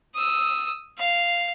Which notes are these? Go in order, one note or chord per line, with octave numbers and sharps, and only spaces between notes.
D#6 E6
F5